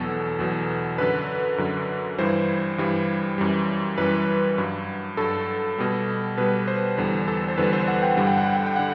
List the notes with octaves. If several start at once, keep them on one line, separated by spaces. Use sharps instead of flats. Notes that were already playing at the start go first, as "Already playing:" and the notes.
Already playing: E2 B2 F#3 A4
E2 B2 F#3
F#2 D3 F#3 B4
F#2 D3 F#3
G2 E3 G3 C5
G2 E3 G3
F#2 E3 G3
F#2 E3 G3 B4
G2 F#3
G2 F#3 A4
B2 G3
B2 G3 B4
C5
E2 D3 G3
A4
C5
E2 D3 G3 B4
C5
F#5
G5
G2 D3 G3 F#5
G5
F#5
G5
F#5
G5
D3 F#5